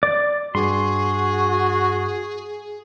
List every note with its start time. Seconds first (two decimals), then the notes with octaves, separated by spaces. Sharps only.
0.03 D5
0.55 G2 F#4 G#4 C6